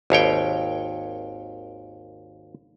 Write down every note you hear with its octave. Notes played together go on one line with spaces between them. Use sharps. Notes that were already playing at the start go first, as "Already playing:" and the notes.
G#1 D#2 C#5 G5